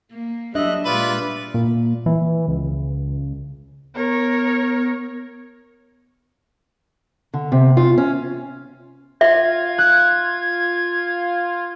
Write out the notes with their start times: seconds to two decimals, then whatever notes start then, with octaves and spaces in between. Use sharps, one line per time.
0.11 A#3
0.55 F#3 G3 D4 D#5 E5 F#6
0.86 A#2 G3 G#3 F4 B4 D5
1.54 A#2
2.06 E3
2.48 C#2
3.95 B3 A#4 C#5
7.34 D3
7.52 C3
7.77 F4
7.98 C#4
9.21 F4 E5 G#6
9.78 F#6